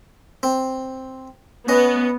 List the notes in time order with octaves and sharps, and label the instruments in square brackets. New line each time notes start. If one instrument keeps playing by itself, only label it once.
[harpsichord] C4
[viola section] B3 [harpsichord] C#4 D#5